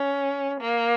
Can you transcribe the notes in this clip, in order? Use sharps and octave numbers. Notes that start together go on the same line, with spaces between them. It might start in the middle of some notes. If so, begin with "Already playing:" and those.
Already playing: C#4
A#3